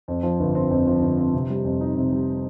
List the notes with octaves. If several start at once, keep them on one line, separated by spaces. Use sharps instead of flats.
F2
F3
G1
C4
F2
F3
G1
C4
C3
G3
F2
D#4
C3
G3